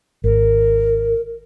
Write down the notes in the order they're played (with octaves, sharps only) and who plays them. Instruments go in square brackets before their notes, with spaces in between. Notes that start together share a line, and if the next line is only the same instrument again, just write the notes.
[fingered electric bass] G#1 [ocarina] A#4